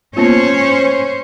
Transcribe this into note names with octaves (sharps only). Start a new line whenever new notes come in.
A#3 B3 C#4 F4 C5 C#5